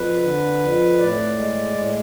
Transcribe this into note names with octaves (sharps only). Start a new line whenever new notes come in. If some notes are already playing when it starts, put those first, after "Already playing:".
Already playing: F2 B4
D3
F2
A2 D5
G#3
A2